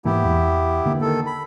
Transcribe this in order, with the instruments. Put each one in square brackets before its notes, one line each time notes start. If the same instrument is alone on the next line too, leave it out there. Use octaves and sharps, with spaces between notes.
[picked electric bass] G#2 E3 A#3 [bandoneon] B3 E4 G4
[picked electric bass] E2
D3 A#3
[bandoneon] D#3 A4
B5